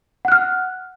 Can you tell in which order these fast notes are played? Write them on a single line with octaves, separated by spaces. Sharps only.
F#5 F#6 F6